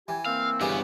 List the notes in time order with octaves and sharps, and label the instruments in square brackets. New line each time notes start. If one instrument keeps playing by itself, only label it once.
[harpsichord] E3 [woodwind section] G4 G#5
[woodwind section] A#3 C4 E6 [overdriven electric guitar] F5
[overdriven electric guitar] G2 B3 [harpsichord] C#3 E3 G4